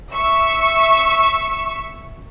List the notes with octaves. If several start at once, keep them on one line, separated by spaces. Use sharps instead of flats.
E5 C#6 E6